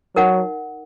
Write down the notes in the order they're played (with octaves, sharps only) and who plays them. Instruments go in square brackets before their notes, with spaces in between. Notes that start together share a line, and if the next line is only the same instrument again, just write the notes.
[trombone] F#3 [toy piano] D#4 A#4 D#5 F#5